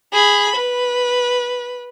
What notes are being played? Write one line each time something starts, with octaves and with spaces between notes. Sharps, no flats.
G#4 B5
B4